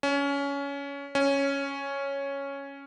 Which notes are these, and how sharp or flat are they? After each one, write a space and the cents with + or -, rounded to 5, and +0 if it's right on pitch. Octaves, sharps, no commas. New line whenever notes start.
C#4 +20
C#4 +0